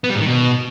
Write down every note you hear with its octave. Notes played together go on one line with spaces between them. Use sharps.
B3
G3
G#2
D#3
B2